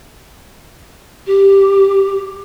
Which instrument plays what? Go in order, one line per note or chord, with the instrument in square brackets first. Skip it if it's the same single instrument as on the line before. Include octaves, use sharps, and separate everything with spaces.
[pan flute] G4